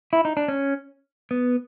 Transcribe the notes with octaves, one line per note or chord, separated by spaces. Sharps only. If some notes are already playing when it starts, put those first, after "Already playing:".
E4
D#4
D4
C#4
B3